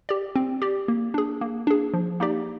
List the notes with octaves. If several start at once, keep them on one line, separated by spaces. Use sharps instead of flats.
G4 D5
C4
G4 D5
A#3
D4 G#4
A#3
D4 G#4
F3
A#3 D#4 G4 D5